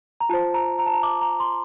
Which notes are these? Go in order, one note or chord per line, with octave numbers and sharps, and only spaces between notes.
A#5
F4 C5 A5
A#5
A#5
A5
A#5
D6
A#5
C6